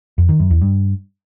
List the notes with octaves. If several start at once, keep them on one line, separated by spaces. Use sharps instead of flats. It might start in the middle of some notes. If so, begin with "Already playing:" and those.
F2
D#3
F#2
E2
G2